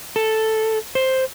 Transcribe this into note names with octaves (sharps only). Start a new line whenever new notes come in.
A4
C5